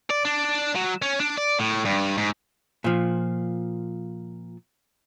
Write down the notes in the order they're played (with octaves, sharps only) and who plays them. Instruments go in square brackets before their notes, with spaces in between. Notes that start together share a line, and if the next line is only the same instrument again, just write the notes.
[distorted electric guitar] D5
D4
F#3
C#4
D4
D5
A2
G2
G#2
[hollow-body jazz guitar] A#2 F3